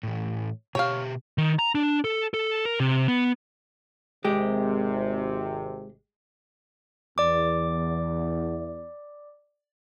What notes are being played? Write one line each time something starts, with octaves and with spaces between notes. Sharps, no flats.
A2 E3
B2 G4 C#5 F5
D#3
A#5
D4
A4
A4
A#4
C3
B3
G#1 C3 G#3 G4
E2 D5 D6